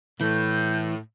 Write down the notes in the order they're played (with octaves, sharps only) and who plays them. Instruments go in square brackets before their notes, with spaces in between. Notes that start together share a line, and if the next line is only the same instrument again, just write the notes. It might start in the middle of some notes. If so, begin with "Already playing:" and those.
[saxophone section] A2 [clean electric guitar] E3 [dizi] G6